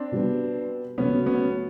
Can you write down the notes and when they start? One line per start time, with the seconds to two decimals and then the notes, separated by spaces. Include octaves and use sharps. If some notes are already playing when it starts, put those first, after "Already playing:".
Already playing: C4 D4
0.12 B2 G3 B3
0.98 C#2 B2 F#3 A3 B3 C#4
1.26 B3 C#4